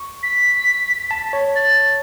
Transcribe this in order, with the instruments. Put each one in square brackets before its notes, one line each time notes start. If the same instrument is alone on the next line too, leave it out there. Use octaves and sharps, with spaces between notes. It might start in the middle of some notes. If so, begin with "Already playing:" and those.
Already playing: [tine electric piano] C#6
[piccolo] B6
[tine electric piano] A5
C#5
[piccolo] A6